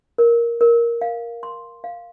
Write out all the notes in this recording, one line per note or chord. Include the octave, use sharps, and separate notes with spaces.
A#4
A#4
F5
C6
F5